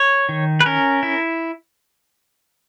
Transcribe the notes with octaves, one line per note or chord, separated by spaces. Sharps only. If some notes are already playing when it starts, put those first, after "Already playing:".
Already playing: C#5
D#3
B4
C#4 A#4
E4